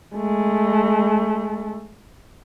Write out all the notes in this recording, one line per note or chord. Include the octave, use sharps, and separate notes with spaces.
G#3 A3